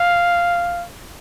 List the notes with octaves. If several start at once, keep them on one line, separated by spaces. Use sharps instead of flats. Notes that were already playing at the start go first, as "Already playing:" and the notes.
Already playing: F5